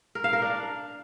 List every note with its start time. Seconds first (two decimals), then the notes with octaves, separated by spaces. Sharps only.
0.15 A#4
0.24 F5
0.33 A#4
0.42 D4